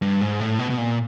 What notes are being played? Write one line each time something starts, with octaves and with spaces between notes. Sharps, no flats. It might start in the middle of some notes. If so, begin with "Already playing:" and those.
G2
G#2
A2
B2
B2
A#2